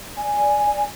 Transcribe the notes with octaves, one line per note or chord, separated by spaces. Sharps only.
D5 G#5